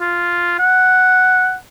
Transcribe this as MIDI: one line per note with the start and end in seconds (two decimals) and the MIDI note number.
0.01 0.59 65
0.59 1.54 78